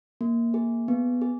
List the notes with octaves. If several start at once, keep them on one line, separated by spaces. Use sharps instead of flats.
A#3
G#4
B3
G#4